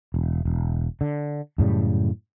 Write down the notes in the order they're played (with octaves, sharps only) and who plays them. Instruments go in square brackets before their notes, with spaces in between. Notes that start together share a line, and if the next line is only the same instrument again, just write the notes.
[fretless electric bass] E1
E1
D3
F#2 A2 C#3 G3